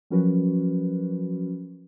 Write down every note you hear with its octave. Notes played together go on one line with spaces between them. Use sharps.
F3 F#3 C#4 F#4 A#4 B4